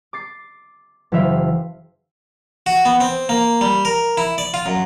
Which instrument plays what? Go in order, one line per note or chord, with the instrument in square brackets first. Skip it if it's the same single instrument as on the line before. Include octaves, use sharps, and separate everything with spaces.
[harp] D6 A6 C7
F#1 E3 C5 E5 F5 B6
[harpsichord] F#4
B3
C4
A#3
G3
A#4
E4
D5
F4
F#2